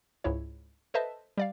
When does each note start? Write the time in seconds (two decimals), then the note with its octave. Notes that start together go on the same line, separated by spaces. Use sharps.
0.24 C#2 G#2 E4 C#5
0.94 A4 B4 C5 D#5 E5 A5
1.38 G3 D5 F5